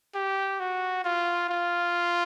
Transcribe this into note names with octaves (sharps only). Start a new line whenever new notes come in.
G4
F#4
F4
F4